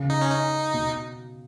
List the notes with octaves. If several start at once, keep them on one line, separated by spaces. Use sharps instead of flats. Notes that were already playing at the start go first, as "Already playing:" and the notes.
Already playing: C#3
D#4
C#4
D#4
B2